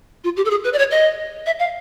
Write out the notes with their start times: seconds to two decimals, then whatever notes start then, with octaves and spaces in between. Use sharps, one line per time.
0.24 F4
0.37 G4
0.45 A4
0.51 G#4
0.64 B4
0.73 D5
0.79 C#5
0.91 D#5
1.46 E5
1.59 F5